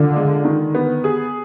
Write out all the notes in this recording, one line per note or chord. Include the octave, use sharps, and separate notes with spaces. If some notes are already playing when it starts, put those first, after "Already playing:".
Already playing: D3 F4
G#3
D#3
B3
G#4